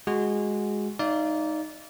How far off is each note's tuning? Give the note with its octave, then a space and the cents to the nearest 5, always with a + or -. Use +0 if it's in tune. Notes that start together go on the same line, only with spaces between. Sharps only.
G#3 +0 F#4 +0 G#5 +0
D#4 +0 D5 -20 F5 -30